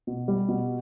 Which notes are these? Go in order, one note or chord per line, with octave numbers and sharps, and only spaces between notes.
B2
G3
B2